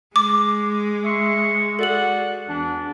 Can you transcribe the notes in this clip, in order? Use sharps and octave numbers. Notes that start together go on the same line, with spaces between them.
G#3 D6
E5 C6 C#6
F#4 A4 D5 F#5 F#7
E2 E3 D4